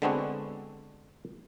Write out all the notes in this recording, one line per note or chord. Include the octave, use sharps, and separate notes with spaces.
D3 G#3 B3 C4 D4 F#4